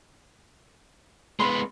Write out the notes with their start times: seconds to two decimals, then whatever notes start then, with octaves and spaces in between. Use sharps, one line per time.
1.40 G#3 B3 B5 C6